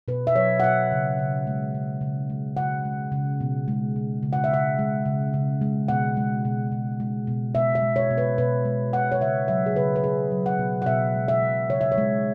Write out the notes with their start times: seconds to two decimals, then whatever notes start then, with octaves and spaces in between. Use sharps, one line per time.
0.08 B2 B4
0.27 E5
0.36 F#3 C#5
0.60 F#5
0.63 B2 E5
0.92 C#3
1.19 C#3
1.47 G#3
1.75 C#3
2.01 C#3
2.30 G#3
2.57 C#3 F#5
2.85 G#3
3.12 C#3
3.41 B2
3.68 G#3
3.96 B2
4.23 C#3
4.33 F#5
4.44 E5
4.51 C#3 F#5
4.79 G#3
5.05 C#3
5.34 C#3
5.62 G#3
5.88 B2 F#5
6.17 G#3
6.45 B2
6.72 B2
7.00 G#3
7.27 B2
7.55 B2 E5
7.75 E5
7.82 G#3
7.96 C#5
8.11 B2
8.18 B4
8.38 B2 B4
8.65 G#3
8.93 B2 F#5
9.12 C#5
9.21 C#3 E5
9.48 F#3 E5
9.66 G#4
9.76 C#3 B4
9.96 B4
10.04 B2 G#4
10.31 F#3
10.46 F#5
10.59 B2
10.82 F#5
10.86 B2 E5
11.15 G#3
11.28 E5
11.42 B2
11.69 C#3 C#5
11.81 E5
11.92 C#5
11.98 G#3